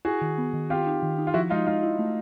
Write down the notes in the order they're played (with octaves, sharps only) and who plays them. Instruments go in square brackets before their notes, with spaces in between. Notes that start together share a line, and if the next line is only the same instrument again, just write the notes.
[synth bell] E4 [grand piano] F#4 G#4
[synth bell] D#3
B3
D#3
[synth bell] C4 [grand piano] F4 G4
[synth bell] D#4
D#3
D#4
[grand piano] F4
[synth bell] F3 [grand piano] E4 F#4
[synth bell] G#3 [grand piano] D#4 F4
[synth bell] G#3 [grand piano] D#4 F4
[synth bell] E4
A3